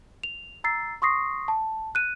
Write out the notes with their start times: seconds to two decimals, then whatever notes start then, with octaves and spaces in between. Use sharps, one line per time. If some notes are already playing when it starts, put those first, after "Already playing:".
0.23 F7
0.64 A#5 E6 A6 C7
1.02 C6 C#6 D#6 A#6 C7
1.48 A5
1.95 F#6 D#7